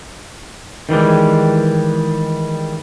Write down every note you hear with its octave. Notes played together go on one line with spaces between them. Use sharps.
D#3 E3 G3 G#3